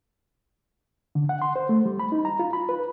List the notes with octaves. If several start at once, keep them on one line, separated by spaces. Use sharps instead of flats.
D3
F#5
C6
C5
A3
G3
B5
D#4
A#5
F4
B5
B4